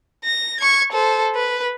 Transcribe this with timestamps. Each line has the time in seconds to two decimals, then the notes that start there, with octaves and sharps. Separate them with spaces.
0.25 A#6
0.61 C#6 G#6
0.93 A4 C5
1.35 B4